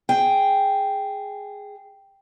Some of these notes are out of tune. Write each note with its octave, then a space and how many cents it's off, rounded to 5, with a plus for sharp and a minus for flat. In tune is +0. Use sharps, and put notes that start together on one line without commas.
G#4 +0 G5 +0